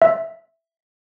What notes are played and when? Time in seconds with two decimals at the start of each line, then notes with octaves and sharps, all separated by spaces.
0.02 E5